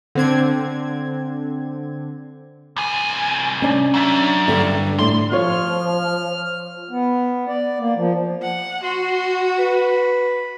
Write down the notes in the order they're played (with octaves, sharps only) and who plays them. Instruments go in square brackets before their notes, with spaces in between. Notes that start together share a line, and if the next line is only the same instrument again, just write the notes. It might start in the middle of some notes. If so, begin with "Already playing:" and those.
[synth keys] D3 C4 G#6
[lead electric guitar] C2 G#5
[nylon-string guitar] C#4 D4
[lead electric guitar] F#3 E5
[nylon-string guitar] G2 D3
[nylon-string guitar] A2 [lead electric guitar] C6
[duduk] F3 [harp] F4 C#5 [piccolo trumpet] F6
[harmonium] B3
D5
A#3
F3
[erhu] F#5
[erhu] F#4 [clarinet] C6
[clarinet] B4